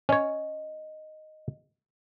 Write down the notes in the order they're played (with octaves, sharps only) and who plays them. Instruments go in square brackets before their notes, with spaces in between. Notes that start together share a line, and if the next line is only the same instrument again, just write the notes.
[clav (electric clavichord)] C#4 C#5 [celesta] D#5